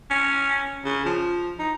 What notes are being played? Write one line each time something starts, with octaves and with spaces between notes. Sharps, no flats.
C#4
C#3
F3
D#4